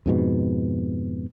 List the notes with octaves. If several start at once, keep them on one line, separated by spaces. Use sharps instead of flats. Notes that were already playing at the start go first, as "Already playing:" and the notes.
F2 G#2 B2